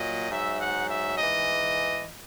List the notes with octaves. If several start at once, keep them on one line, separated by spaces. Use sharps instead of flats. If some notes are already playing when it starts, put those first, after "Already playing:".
Already playing: A#2 F#3 D#5
G#2 F#3 E5
F#5
E5
G#2 E3 D#5